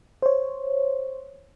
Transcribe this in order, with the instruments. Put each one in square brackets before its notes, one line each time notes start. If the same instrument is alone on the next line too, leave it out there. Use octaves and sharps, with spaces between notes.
[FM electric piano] C5 C#5